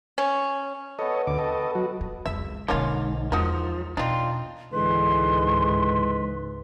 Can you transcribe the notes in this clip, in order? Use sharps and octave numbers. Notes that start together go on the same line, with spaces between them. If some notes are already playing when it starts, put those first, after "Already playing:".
C#4
B3 A4 B4 C#5 D#5
D2 D6
A4 D#5 G5 A5 C#6
F#3 F#4
F#3
F1 C#2 E5
B1 G#2 D3 A#3 C#4 F4
E2 F3 D#4 F#4 A#4
B2 C4 D4 D#4 F4
C#2 G#2 D3 E3 G#3 B4 C6